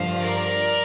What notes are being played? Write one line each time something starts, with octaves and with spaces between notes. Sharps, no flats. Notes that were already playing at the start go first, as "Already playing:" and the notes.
Already playing: G2 D3 F3 C5 F5
A#4 D5